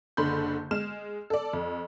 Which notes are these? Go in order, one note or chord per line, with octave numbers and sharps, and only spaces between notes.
F#1 D3 B5 C6 G6
G#3 F6 E7
A4 D5
F2